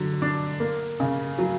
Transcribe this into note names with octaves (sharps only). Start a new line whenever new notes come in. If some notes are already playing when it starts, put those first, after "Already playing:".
Already playing: D3 F#3
D4
A#3
C#3
F#3